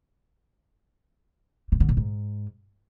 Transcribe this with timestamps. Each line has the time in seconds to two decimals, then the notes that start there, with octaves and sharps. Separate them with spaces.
1.72 C3
1.80 D3
1.89 A2
1.97 G#2